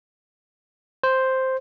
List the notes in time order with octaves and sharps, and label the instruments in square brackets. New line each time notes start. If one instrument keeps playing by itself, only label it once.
[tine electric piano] C5